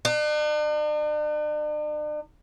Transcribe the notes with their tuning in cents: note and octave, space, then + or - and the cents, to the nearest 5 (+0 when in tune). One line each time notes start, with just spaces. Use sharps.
D4 +45